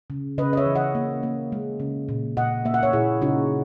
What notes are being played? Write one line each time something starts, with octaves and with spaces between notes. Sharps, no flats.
C#3
C#3 B4 D#5
D#5
C#5 E5
E3
D#5 F#5
A#3
A#3
G#3
C#3
A#2
A#2 D#5 F#5
A#3 E5
F#5
C#5 E5
A#2 E4 G#4
C#3 D#4 F#4